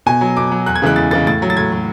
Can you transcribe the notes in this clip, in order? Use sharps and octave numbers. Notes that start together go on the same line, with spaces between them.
B2 G#5
F#3
B2 D6
F#3
E2 F#6
G#6
C#3 E3 G#3 F#6
E2 A6
C#3 E3 G#3 A6
A2 A6
F#3
A6
A2 G#6
F#3